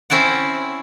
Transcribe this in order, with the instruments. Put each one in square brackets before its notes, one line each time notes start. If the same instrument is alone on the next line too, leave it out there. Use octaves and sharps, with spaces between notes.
[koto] C4 C#4 E4 D5 F#5